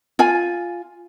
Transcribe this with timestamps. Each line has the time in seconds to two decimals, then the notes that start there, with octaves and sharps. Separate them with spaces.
0.19 F4 G#5